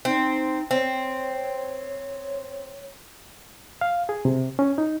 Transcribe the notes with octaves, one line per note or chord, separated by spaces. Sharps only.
C4 D#4
C4 C#5
F5
G#4
C3
C#4
D#4